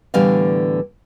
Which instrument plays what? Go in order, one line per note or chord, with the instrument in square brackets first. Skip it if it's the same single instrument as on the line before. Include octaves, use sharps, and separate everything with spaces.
[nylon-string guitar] A2 D3 E3 G3 B3 F5